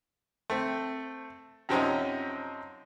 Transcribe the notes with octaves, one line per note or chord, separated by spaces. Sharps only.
A3 C4
F#2 C3 F3 C4 C#4 D#4